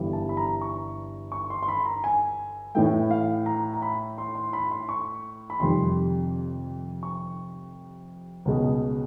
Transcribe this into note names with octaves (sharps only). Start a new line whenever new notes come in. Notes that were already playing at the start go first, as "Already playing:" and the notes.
Already playing: G1 G2 E3 G3
A5
B5
A#5
C#6
C#6
C6
C6
B5
A#5
G#5
A2 E3 A3 G5
F5
A#5
A#5
B5
C6
C6
B5
C6
C#6
B5
F1 F2 C3 D#3 G3 C6
C#6
C#2 B2 G#3